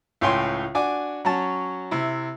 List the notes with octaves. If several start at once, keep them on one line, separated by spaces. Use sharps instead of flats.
C#2 A2 C#5 G5 G#5 C6
D4 F#4 G#5 D6
F#3 C#4 A5
C3 E4